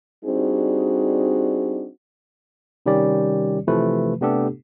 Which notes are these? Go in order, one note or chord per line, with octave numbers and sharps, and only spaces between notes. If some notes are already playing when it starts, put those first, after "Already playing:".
G3 C4 D4 D#4 F#4 G#4
C3 D#3 G3 C#4 G4 D5
C3 E3 F3 A3 B4
C3 A3 B3 D4 G4 A4